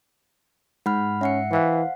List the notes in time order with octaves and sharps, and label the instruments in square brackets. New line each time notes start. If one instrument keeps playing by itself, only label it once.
[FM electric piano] G#2 [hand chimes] F#5 B5 F6
[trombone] C#4 [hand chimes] E5 F#5 C#7
[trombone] E3 [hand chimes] C5 F5 F#5